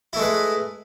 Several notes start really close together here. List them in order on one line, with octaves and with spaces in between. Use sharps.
E4 A3 G#3 B4